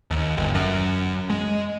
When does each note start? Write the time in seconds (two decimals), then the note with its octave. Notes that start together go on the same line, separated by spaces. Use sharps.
0.11 D#2
0.37 G1
0.54 F#2
1.30 G#3